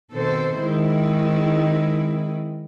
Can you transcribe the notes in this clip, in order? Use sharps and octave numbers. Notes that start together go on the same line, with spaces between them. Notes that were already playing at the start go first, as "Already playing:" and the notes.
B2 D#3 C4 A4 C5
D#3 G#3 C4 E4